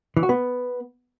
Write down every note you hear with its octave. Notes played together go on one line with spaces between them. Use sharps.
E3
F#4
B3